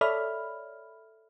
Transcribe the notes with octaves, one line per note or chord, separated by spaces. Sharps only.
A4 C#5 D5 E5 B5 F6